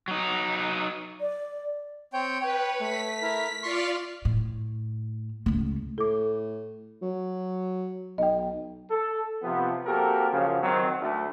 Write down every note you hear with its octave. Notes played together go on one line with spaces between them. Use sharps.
F#3 D#4
D5
C4 C#5 G5
B4 C#5 G5
A3 B6
E4 A#4
F4 D5 F5 C6 C#6
A2
C#2 A3
A2 A4 D6
F#3
B1 D#5 G5
A4
C3 F3 B3
A#3 C4 F#4 G4 A4 A#4
F#2 C#3 F3
D#3 F#3 C4
D2 A3